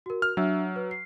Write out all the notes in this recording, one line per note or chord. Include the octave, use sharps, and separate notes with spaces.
F#4 A#4
F6
F#3 D4 E5 E6
B4
C7